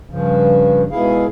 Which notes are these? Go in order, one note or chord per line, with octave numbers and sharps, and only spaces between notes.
G2 C#3 F3
G#2 B2 E4 G#4 F5